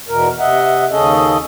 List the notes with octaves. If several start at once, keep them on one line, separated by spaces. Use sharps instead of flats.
E2 B2 A#4
C3 D#5 E5 F#5
D#2 C#3 C#4 G#4 A4 D#5